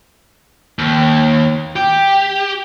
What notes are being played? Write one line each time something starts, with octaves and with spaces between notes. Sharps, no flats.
D#2
G4